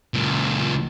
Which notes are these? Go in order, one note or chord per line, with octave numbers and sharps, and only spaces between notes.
C#2 A#2